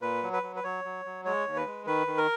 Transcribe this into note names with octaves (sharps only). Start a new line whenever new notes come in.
A#2 B4
F#3
B4
F#3
B4
F#3 C#5
F#3
F#3
G#3 C#5
D#2
B4
G#3
D#3 B4
D#3
A#4